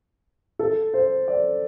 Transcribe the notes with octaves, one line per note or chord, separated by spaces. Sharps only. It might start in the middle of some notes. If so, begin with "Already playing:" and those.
A4
C5
D5